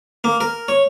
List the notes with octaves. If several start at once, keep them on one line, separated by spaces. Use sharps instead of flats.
A#3
A#4
C#5